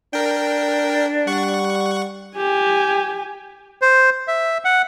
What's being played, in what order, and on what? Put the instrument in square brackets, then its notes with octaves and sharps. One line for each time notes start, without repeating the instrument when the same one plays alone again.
[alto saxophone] D4 [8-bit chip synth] A#4 G5
[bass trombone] G3 [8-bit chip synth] F#5 C#6
[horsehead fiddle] G4 G#5
[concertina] C5
E5
F#5